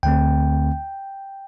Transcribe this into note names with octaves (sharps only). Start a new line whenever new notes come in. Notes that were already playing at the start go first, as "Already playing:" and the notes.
D2 D3 A3 C4 G5